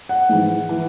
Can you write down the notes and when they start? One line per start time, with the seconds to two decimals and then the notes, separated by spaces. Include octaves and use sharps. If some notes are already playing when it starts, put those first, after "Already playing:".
0.09 F#5
0.29 G#2 E3
0.69 E3